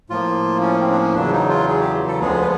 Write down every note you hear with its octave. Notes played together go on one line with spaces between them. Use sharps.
A2 F3 A#3 F4
C#4
C4
D4
C#4
E2 C#3 F#3 D4
D#4
F4
G#4
G4
A4
D2 D3 F3 G#3 B3 G#4
B4